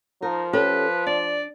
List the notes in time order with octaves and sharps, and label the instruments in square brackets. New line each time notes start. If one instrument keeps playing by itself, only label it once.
[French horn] F3 [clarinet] D#4 [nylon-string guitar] A#4
[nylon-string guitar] C#4 G4 A4 [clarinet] B4
[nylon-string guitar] D4 [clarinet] D5